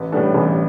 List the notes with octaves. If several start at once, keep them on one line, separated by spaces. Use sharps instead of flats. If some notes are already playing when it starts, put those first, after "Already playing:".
Already playing: A1 B4
A2 G3 B3 D4 A4
A1